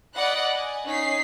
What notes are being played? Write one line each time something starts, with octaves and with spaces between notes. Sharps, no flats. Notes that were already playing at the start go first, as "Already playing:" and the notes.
D5 D#5 F#5 B5 F#6
G#5
C#4 D#4 B6 C7